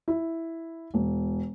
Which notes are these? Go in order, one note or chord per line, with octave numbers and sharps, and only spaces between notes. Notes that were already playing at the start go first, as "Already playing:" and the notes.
E4
E1